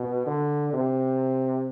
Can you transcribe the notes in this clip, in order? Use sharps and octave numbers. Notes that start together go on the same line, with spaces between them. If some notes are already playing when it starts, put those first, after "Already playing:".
Already playing: B2
D3
C3